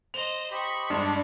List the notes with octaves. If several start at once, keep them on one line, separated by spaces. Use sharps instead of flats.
C5 D#5 F7
G4 C5 D#5 B5 C#6
G2 G#3 D4